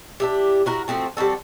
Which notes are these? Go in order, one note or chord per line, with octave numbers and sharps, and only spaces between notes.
D4 E4 G4
E4 F#4 A#4
F3 A3 C4 F#4
G3 C4 F#4 A4